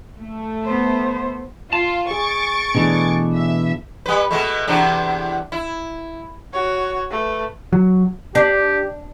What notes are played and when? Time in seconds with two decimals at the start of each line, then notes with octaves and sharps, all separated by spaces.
0.20 A3
0.65 B3 C5
1.73 F4 A5
2.11 G#4 C#6 A6 D7
2.75 B2 E3 A3 D4 G#4
3.34 E5
4.06 G3 B4
4.31 B2 G#3 A3
4.67 E2 C3 D4
5.52 E4
6.53 F#4 C#5
7.10 A3 B4
7.73 F#3
8.35 D4 G4